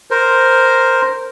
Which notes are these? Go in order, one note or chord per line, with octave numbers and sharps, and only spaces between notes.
A#4 C5